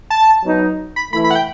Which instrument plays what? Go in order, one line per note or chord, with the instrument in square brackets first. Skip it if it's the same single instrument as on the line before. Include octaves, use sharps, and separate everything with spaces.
[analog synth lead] A5
[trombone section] F#3 B3 D#4
[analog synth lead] B5
[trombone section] E3 A3 E4 [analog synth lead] B5
[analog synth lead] B5
F#5
G5